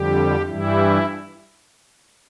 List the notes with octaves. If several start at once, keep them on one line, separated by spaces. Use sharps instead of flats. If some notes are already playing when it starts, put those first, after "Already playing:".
Already playing: F2 D3 G3 G4
G2 E3 G3 E4